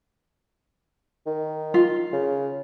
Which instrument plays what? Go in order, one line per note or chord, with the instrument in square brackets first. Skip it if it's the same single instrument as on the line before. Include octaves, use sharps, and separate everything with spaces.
[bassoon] D#3
[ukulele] F4
[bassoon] C#3